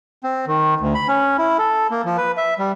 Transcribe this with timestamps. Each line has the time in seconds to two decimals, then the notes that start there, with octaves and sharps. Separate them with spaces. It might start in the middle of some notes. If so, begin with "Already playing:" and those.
0.24 C4
0.47 D#3
0.81 D2
0.95 B5
1.08 C#4
1.38 E4
1.58 A4
1.91 A#3
2.05 F3
2.18 B4
2.37 E5
2.59 G3